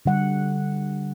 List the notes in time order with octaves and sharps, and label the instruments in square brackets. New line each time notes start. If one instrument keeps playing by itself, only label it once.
[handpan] D3 G3 F#5